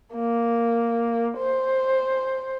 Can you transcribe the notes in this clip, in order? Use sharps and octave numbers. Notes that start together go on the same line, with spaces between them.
A#3
C5